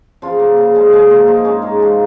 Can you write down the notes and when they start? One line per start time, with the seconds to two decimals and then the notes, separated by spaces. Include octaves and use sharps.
0.22 C#3 F3 F4
0.39 A#3
0.58 C#3
0.75 F3 G#3
0.92 A#2 G#3 G#4
1.10 F3 A#3 F4
1.28 G#2 D#4
1.45 G#3 C#4
1.62 G#2 D#4
1.80 F3 G#3